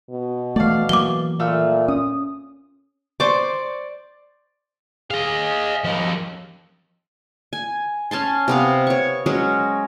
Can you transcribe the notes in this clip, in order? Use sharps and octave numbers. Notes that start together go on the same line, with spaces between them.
B2
E3 A3 D5 F5
E3 F#3 A#3 D6 G7
A#2 A3 F5 E6
C#4 D#6
C5 D5 C#6 D6
G#4 D#5 F5
D#2 F3 D#5
G#5
C#4 G#5 A5 C6
C3 B3 F5
C#5 C#6
F#3 G#3 C#4 C#5